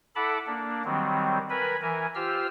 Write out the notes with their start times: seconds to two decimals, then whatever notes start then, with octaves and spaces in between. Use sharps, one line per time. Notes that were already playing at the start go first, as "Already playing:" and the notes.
0.16 E4 A4 F#5 A5 B5 D6
0.47 A#3 D4
0.85 D#3 F#3 G3 C4
1.50 A#4 B4 G#5 B5
1.82 E3 A#4 G#5
2.15 F4 G4 C5 E6 F6